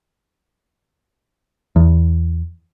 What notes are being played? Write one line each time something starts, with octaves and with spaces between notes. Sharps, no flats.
E2